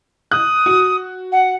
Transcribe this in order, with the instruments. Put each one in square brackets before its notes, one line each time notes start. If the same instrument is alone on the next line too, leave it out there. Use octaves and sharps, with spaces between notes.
[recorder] D#6 [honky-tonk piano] F#6
[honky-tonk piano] F#4
[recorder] F#5